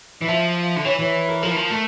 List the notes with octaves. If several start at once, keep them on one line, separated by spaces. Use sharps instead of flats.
E3
F3 E5
D3
E3 C#5
E3 C#5
A#4
F3 A#4
E3
F3
A3